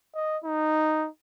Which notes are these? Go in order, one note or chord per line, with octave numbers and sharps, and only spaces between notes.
D#5
D#4